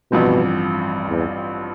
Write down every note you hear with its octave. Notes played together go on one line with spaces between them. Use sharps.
A1 G2 B2 F3 C4
E2